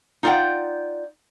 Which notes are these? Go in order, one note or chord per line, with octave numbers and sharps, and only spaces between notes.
D#4 F4 D5 E5 F#5 G5